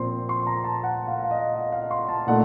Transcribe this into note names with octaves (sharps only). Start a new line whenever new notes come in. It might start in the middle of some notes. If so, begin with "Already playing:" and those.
Already playing: A#2 F3 C4 C6
C6
A#5
A5
F#5
F5
F5
D#5
F5
F5
C6
A5
A#2 A3 D#4 F#5